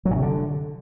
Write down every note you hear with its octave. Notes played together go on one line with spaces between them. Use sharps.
F#3
A#2
C3
D3